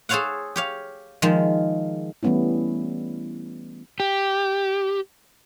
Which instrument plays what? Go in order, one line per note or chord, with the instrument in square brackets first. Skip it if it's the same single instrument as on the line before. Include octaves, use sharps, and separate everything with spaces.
[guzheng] G#4 A4 C5 C#5 F5 F#5
G4 C#5 F5
D#3 F3 G#3
[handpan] E3 G3 A3 B3 C#4 E4
[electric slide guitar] G4